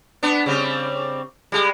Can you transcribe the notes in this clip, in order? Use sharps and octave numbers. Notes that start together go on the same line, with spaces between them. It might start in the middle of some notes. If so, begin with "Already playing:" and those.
B3 D4
C#3 G3 C4
G3 G#3